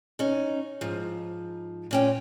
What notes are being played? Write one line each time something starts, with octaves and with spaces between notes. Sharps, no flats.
C#4 D#4
G#2 F3
A#2 C#4 G5